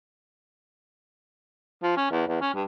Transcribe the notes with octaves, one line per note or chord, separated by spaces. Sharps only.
F3
C#4
E2
E2
C#4
G2